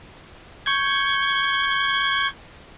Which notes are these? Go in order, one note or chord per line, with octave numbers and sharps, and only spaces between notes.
C#6 G6 G#6